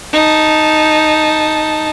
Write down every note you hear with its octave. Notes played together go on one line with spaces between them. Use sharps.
D#4 A5